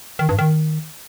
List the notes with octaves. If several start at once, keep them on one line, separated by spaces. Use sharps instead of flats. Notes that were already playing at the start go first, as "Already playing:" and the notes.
D#3
G2
D#3